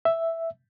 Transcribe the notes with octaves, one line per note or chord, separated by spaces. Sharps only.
E5